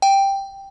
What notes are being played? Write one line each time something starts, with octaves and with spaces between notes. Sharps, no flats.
G5